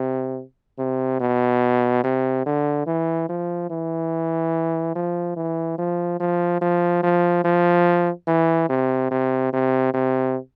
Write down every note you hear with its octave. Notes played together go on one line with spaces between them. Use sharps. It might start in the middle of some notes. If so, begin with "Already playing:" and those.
Already playing: C3
C3
B2
C3
D3
E3
F3
E3
F3
E3
F3
F3
F3
F3
F3
E3
C3
C3
C3
C3